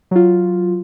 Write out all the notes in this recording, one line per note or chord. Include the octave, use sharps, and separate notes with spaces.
F#3 F4